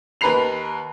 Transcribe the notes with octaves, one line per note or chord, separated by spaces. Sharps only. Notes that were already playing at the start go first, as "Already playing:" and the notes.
D#2 B4 A#5 B5 C7 F7